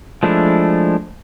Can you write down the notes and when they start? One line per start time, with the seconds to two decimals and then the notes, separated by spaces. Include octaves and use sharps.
0.23 F3 G#3 A3 D4 E4